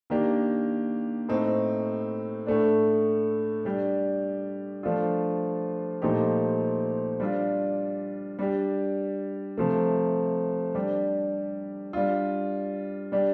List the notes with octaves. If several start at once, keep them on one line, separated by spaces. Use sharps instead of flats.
D#3 A#3 D4 G4
A2 A3 C4 D#4
A2 A3 D4
G3 D4 G4
F3 A3 D4 F4
A#2 F3 A3 D#4 G4
G3 D4 F4
G3 D4 G4
C3 F3 A3
G3 D4 G4
G3 D4 F4
G3 D4 G4